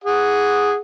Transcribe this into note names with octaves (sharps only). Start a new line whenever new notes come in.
G#4 F#5